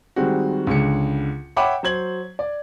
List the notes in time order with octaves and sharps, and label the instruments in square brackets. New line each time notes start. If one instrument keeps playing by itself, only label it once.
[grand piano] D#3 G3 G#3 C4 F#4
C#2 D3 G#3 C#7
C#5 E5 F#5 G5 B5 D6
F#3 C5 G#6 F#7
D5